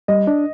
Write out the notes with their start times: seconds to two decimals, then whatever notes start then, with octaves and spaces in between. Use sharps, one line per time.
0.08 G3 D#5
0.27 D4